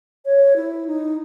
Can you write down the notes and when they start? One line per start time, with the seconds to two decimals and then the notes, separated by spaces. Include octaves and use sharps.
0.25 C#5
0.56 E4
0.87 D#4